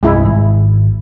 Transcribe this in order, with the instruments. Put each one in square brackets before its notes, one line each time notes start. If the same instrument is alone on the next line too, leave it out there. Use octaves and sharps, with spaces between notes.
[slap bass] C2 G2 [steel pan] G#3 E4
[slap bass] G#1